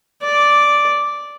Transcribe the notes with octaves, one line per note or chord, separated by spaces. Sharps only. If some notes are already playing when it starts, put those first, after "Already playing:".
D5